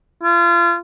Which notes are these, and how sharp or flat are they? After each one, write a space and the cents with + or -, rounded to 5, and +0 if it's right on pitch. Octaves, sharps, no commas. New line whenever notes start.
F4 -30